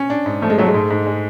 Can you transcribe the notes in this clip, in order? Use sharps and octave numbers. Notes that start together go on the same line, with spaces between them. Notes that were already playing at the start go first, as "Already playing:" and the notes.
Already playing: C#4
D4
G#2
F3 A3
G#3
F#3 A3
G#3
G#2
G#2
G#3